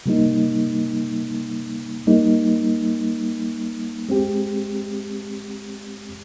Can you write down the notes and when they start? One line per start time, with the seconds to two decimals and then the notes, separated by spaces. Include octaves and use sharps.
0.06 C3 G3 A#3 D#4
2.07 G3 A#3 D#4
4.09 G#3 C4 G4